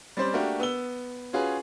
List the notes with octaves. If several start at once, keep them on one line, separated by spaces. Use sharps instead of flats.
G3 C4 C#4 C5 D5
A3 A#3 D4 F#4 G4 A#4
B3 E6 G7
C#4 F4 F#4 G#4 B4